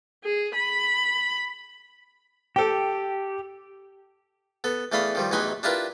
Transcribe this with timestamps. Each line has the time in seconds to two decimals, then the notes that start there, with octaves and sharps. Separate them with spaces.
0.24 G#4
0.55 B5
2.56 G4 A4 G5
4.64 B3 A4
4.92 E2 A3 D5 F5 B5 D#6
5.15 D#3 F3 G3
5.31 A1 E2 F#3 D#4 B4 G#5
5.63 D4 E4 F4 G4 A#4 B4